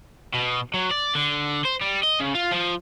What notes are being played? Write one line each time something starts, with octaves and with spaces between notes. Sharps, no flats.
B2
F#3
D5
D3
C5
G3
D#5
C#3
F4
F3